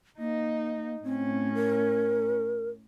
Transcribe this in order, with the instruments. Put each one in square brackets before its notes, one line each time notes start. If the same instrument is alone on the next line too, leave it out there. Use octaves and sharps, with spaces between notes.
[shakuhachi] A#3 [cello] D#4
[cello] A2 C#4 [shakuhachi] C4
[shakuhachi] A#4